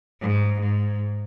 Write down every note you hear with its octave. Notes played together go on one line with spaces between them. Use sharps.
G#2
G#2